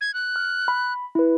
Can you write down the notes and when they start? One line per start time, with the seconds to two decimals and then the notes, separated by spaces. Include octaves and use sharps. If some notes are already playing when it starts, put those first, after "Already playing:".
0.01 G#6
0.14 F#6
0.36 F6
0.68 B5
1.15 E4 B4